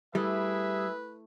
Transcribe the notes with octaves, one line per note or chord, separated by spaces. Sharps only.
G3 A3 E4 G#4 B4 E5